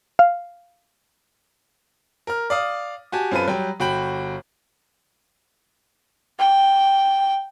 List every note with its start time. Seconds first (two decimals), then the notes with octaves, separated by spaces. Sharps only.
0.19 F5
2.27 A#4 F6
2.50 D5 F5 D#6
3.12 F#4 G4 G#5 A5
3.31 F#2 C4 F4 A4 B4 D#7
3.48 F#3 G3 G5
3.80 G1 F#4 G5 B5 F#7
6.39 G5